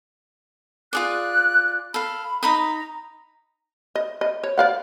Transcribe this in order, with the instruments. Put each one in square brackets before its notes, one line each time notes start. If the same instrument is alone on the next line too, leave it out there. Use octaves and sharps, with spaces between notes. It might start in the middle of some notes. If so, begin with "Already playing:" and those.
[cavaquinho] F4 G#4 D5 [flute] F#6
[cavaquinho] A4 F5 [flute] B5
[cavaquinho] D#4 B5 D#6 [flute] A#5
[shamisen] D#5
D#5
C#5
D5 F5 F#5